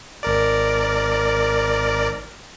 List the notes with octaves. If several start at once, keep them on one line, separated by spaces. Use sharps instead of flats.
G#1 A#4 D5